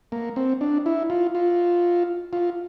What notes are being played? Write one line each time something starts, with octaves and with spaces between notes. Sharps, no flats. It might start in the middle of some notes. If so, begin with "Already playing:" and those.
A#3
C4
D4
E4
F4
F4
F4